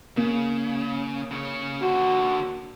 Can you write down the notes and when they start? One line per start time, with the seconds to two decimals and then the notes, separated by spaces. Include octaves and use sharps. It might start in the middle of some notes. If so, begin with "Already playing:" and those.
0.17 C#3 A#3
1.31 C#3 C#5
1.82 D3 F#4 C5